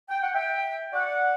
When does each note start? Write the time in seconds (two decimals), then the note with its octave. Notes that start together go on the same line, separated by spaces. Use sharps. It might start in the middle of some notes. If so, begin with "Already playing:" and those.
0.09 G5
0.22 F#5
0.33 E5 G5
0.92 D5 F#5